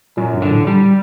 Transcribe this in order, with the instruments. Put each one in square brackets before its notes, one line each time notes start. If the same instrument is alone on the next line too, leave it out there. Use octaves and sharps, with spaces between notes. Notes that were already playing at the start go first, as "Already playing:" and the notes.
[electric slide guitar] F#2 [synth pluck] A#2
[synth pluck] G2
[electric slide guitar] D3
[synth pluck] A2
[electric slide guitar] G3